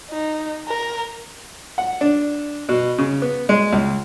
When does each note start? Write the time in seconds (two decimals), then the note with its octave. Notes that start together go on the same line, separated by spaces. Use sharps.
0.10 D#4
0.68 A#4
1.78 F#5
2.01 D4
2.69 B2
2.98 C#3
3.22 B3
3.49 G#3
3.73 C#2